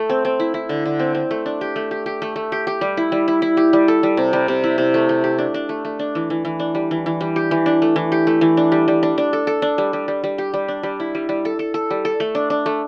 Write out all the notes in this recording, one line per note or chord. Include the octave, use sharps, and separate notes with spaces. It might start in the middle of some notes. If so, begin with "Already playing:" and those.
Already playing: A3 A4
C4
C4
E4
E4
D3
D3
C4
C4
A3
D4
G4
A3
G4
G4
A3
A3
G4
G4
G3
E4
G3
E4
E4
G4
G3
A4
G3
C3
G3
C3
E4
C3
A3
A3
G4
D4
D4
A3
A3
D4
E3
E3
E3
D4
G3
E3
E3
G3
G4
E3
D4
A3
E3
G4
A3
E3
D4
G3
G3
D4
D4
A4
A4
D4
G3
G3
G3
G3
G4
G3
D4
G3
E4
G3
G3
A4
A4
A4
G3
A4
A3
D4
D4
A3